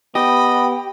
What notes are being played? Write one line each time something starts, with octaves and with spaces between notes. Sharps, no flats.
B3 G4 D#5 B5